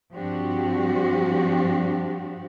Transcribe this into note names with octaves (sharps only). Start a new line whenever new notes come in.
G2 F3 C4 D4 F#4 G4